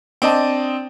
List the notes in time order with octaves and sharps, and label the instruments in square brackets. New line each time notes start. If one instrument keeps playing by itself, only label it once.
[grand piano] C4 D4 D#5 A5